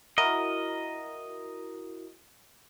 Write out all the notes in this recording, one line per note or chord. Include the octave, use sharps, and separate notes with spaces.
E4 F#4 A#4 D#5